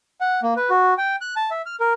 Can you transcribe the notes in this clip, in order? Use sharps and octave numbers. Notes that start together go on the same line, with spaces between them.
F#5
A#3
B4
F#4
G5
F#6
A5
E5
F6
A#4